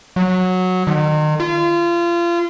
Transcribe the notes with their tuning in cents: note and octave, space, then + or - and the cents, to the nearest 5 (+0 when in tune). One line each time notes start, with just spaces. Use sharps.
F#3 -10
D#3 -35
F4 -30